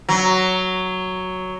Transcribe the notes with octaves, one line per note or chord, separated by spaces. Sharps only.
F#3